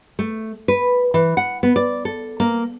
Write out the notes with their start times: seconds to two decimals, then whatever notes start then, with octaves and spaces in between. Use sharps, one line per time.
0.19 A3
0.68 B4
1.14 E3
1.37 F#5
1.63 B3
1.76 D5
2.05 A4
2.40 A#3